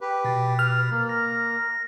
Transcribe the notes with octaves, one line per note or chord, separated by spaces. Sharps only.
G4 B4
B2 A6
B4 F6
A#3
A#6